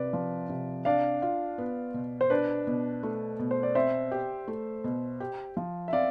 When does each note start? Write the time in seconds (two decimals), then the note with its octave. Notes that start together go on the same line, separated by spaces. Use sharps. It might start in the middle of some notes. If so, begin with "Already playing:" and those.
Already playing: C3 B4 D5
0.13 F3
0.49 C3
0.85 D4 D5 F5
1.22 F4
1.58 B3
1.94 B2
2.21 C5
2.30 D4 B4 D5
2.67 B2
3.03 A3
3.39 B2
3.51 C5
3.63 D5
3.75 C4 C5 E5
4.11 G4
4.48 A3
4.84 B2
5.20 G4
5.57 F3
5.88 E5
5.93 C4 D5 F5